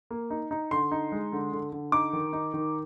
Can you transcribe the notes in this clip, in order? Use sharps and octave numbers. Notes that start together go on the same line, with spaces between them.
A#3
D#4
D#4
D3 C6
D#4
G#3
D3
D3
D3
D#4 D6
D#3
D#4
D#3